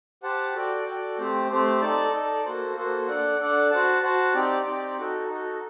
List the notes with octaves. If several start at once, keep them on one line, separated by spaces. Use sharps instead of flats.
G4 C5 F#5 A5
F#4 A4 D5 G5
F#4 A4 D5 G5
A3 C4 G4 C5
A3 C4 G4 C5
D#4 A4 D5 A5
D#4 A4 D5 A5
A#3 F#4 A4 C5
A#3 F#4 A4 C5
D4 A4 D5 F#5
D4 A4 D5 F#5
F#4 C5 F#5 A5
F#4 C5 F#5 A5
C4 D#4 G4 D5 G5
C4 D#4 G4 D5 G5
D#4 F#4 A4
D#4 F#4 A4